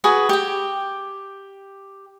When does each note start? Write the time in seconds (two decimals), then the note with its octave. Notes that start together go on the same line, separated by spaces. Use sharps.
0.04 F#4 G#4 B4
0.29 G4 G5